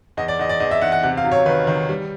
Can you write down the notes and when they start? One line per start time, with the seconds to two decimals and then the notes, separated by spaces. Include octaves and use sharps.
0.17 E2 D#5
0.28 D5
0.39 E2 D#5
0.49 D5
0.60 E2 D#5
0.71 E5
0.81 E2 F#5
0.92 F#5
1.03 C3 F#5
1.17 F5
1.24 F#3
1.31 C#5
1.46 D#3 B4
1.67 D#3
1.89 G3